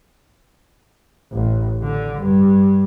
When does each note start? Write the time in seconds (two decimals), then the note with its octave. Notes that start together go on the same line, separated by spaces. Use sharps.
1.33 A1
1.83 D3
2.18 G2